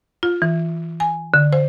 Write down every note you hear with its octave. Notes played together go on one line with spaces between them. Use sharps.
F4
E3
G#5
D3
C5